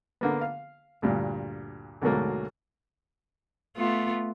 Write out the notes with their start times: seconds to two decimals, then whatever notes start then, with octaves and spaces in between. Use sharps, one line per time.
0.21 D3 A#3 B3
0.41 F5
1.02 D2 G2 A#2
2.02 D2 G#2 B2 F#3 A3 A#3
3.77 A3 B3 F4